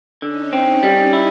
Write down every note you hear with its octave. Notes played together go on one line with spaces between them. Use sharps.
D3 C#4 D#4
C4
G3
E4